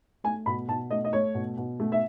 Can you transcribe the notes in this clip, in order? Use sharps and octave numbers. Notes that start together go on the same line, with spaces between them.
A3 G#5
B2 B5
B2 A5
A3 D#5
D#5
A3 C#5
B2
B2
A3
E5